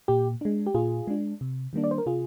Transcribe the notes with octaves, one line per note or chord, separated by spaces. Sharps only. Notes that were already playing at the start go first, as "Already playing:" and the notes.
A#2 G4
G#3 D4
G4
A#2 F4 G#4
G#3 D4
C3
D#3 G3 A#3 D4
D5
C5
A#4
C3 F4 G#4